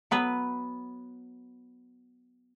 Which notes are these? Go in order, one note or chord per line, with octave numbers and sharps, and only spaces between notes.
F#3 B3 B4